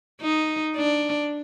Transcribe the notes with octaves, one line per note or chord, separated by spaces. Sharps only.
D#4
D4